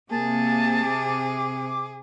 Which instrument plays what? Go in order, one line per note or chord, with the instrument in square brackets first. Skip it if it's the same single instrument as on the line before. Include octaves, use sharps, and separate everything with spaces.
[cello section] C3 [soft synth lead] A#3 [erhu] G#4 [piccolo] A5
[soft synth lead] D6